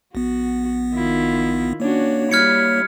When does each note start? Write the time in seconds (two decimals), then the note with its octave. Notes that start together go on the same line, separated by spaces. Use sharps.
0.15 A#1 B3 F#4
0.93 D#3 E4 F4
1.80 A#3 C#4 D4 F#4 C#5
2.31 G3 E4 F6 G#6 C#7